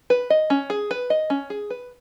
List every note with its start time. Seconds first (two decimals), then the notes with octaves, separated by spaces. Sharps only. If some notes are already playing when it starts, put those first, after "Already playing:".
0.10 B4
0.30 D#5
0.50 C#4
0.70 G#4
0.91 B4
1.10 D#5
1.30 C#4
1.50 G#4
1.70 B4